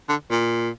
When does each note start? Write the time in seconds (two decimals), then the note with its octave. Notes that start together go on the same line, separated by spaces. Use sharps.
0.09 D3
0.30 A#2